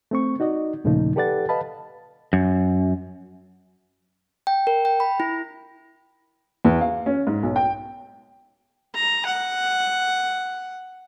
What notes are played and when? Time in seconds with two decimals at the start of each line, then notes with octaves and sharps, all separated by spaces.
0.11 A3 C4 C#6
0.40 D#4 F#4 D5 D#5
0.84 D#2 A#2 C#3 F3 A3 D#4
1.16 G4 A4 B4 D5 F#5 A6
1.49 B4 D#5 F5 A5 B5
2.33 F#2
4.47 G5
4.67 A#4
4.85 G5
5.00 B5
5.20 E4
6.65 E2
6.81 F5
7.06 C#4
7.27 G#2
7.43 B1
7.56 G5
8.95 A#5
9.26 F#5